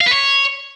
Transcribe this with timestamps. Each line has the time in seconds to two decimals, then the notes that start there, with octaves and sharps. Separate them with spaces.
0.01 F5
0.06 B4
0.11 C#5